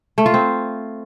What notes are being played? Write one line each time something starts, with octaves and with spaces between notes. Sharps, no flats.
A3
F4
C4